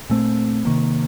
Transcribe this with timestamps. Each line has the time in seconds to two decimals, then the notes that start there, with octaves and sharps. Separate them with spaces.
0.10 A#2 A3 C4
0.65 C3 D#3 A#3